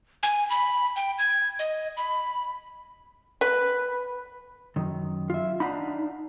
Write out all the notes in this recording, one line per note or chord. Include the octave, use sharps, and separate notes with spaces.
G#5
B5
G5
G#6
D#5
B5
B4
F#2 D#3
F4 E5
D4 D#4 F5 F#5 B5